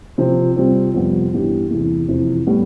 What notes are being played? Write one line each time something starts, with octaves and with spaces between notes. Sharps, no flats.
C3 F3 C4
C3 G3 C4 F4
F2 C3 G3 B3
G2 E3 B3 D4 G4
E2 C3 E3
F2 C3 E3
A2 G3 B3